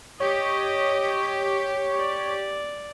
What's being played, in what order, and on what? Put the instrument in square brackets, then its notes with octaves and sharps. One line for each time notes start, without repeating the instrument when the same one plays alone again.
[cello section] G4 [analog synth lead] C#5 [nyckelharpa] D#5
[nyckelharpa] D5